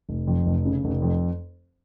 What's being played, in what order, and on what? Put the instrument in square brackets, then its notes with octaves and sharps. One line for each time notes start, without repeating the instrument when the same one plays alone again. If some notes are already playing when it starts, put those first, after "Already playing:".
[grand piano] F1
F2
F1
C#3
F1
F2